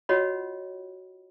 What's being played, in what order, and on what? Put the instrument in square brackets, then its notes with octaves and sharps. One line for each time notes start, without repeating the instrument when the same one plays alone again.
[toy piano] F4 F#4 C#5 D#5 F#5 B5